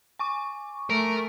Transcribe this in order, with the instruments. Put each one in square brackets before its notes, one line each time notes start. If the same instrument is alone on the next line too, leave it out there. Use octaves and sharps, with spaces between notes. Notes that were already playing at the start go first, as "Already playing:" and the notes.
[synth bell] G#5 C#6 D6
[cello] A3 [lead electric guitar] A#4